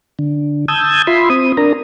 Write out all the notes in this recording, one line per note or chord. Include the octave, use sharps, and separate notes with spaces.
D3
A5 D#6 E6 G6 G#6
F4 E5 B5 C6
C4 D#6
D4 A#4 A#5